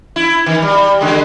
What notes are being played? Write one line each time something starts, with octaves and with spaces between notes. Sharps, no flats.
E4
D#3
G3
D3 G#3